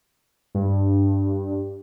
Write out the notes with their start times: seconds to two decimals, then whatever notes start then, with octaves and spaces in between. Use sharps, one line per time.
0.55 G2